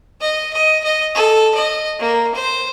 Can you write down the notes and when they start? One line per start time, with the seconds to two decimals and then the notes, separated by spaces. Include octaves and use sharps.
0.21 D#5
0.53 D#5
0.84 D#5
1.15 A4
1.55 D#5
2.00 A#3
2.35 C5